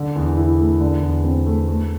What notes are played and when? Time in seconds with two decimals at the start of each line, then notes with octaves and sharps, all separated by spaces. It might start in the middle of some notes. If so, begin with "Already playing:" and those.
Already playing: D3
0.16 E2
0.37 E4
0.59 A3
0.81 D3
1.02 E2
1.24 C4
1.46 A3
1.68 A3